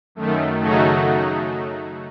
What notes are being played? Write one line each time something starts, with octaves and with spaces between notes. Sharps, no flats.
F#2 D#3 A3
C#3 F#3 A3 D#4 F#4